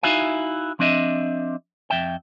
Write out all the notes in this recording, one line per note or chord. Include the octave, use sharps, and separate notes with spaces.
D#4 E4 F#4 E5 F5 G#5
F3 C4 D4 D#5 E5
F2 E5 G5